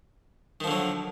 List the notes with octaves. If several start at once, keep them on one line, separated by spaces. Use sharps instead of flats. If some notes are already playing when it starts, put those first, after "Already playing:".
D3 D#3 F3 F#3